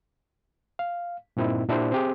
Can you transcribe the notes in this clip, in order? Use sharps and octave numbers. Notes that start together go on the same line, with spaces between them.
F5
G2 A#2 C4 D#4 E4
A#2 D4 E4 G4 C5
C4 G4 G#4